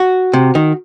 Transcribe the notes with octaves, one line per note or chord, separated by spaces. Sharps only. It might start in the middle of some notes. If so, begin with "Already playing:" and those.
Already playing: F#4
C3
D#3